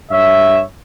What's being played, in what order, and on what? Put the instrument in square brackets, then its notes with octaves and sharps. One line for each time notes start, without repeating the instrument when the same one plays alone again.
[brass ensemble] G2 C#5 E5